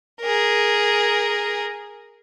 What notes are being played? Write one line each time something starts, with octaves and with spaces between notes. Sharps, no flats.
G#4 A#4